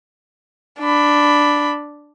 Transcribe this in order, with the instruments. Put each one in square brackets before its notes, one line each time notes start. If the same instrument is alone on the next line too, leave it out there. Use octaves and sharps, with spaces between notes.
[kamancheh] D4 B5